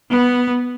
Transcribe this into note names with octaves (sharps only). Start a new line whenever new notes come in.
B3